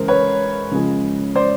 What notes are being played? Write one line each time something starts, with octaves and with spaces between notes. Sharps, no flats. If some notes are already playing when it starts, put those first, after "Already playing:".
Already playing: C#3 E3 G#3 A#4 C5
B4 C#5
C#3 F3 G#3
C5 D5